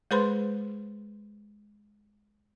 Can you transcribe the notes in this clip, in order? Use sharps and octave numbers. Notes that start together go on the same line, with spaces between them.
G#3 G#4 B4 C5 B5 C6